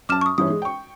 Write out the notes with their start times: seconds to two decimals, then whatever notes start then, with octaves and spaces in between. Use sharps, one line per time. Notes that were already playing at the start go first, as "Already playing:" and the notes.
0.09 F#2 A5 D6 F6 E7
0.21 C#6 D#6
0.38 G2 E3 C#4 D#6
0.50 G#3
0.62 G5 C#6